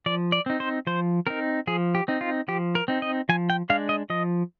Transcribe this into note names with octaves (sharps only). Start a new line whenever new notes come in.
F3 D5
D5
C4 D#4
C5
F3 C5
C4 D#4 A#4
F3 G#4
G4
C4 D#4
F4
F3 G4
A#4
C4 D#4
D#5
F3 G#5
G5
G#3 D4 F5
D#5
F3 D#5